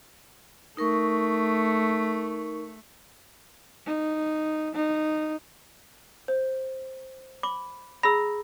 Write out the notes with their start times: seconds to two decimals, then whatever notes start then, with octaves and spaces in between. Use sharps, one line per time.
0.77 A3 D#4 A#4 C#6
3.86 D#4
4.75 D#4
6.28 C5
7.43 B5 D6
8.03 G#4 A#5 B5 E6 A#6